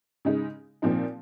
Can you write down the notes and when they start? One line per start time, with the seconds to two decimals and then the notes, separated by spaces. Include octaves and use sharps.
0.25 C#3 G#3 D#4
0.82 A#2 F3 C4 D#4